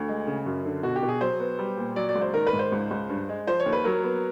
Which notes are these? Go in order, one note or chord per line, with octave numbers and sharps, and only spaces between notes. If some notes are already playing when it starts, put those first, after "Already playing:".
Already playing: D2
G#3
C#3
F#2
D3
B2 F#4
G4
B2
G#4
F#3 C5
B3
G3
A#2
F#3 D5
D5
C#2
C5
D#3 A#4
B4
G#2
C5
C#2
C#2
G2
G#3
F3 C5
C#5
D#2
B4
F#3 A#4
B3